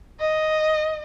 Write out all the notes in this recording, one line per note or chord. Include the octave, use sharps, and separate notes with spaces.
D#5